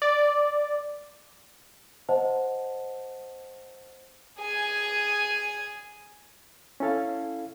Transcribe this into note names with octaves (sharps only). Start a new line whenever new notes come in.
D5
C5 D#5 F#5 A5
G#4 G#5
C#4 E4 A4 F5